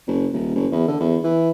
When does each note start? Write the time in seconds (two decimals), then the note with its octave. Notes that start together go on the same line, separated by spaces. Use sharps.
0.07 F#1
0.33 D#1
0.55 F#1
0.72 E2
0.88 D3
1.00 E2
1.24 E3